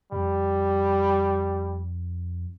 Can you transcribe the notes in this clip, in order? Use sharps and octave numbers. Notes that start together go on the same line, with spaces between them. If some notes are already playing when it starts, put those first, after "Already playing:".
F2 G3